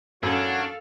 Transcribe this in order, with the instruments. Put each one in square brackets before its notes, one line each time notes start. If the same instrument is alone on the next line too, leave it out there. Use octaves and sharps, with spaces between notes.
[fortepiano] F#2 [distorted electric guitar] D4 [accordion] F#4 C#5 [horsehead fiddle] A4 F5